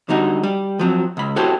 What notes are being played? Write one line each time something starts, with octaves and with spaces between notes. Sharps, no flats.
D3 G3 D#4 F#4
G3
F3 F#3 C4
C#2 B5
E4 F#4 G4 A4 C5 C#5